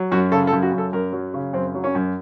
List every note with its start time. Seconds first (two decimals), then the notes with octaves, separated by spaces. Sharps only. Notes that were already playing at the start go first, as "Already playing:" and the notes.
Already playing: F#3
0.12 F#2 F#4
0.31 C#3 A4
0.47 A4
0.52 F#2
0.62 F#4
0.72 F#2
0.78 A4
0.93 F#2 A#4
1.13 F#3
1.34 C#3
1.53 F#2 C4
1.75 F#3
1.84 C#4
1.95 F#2